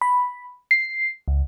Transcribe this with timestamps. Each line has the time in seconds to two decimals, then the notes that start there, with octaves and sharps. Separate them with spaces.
0.01 B5
0.71 C7
1.28 C#2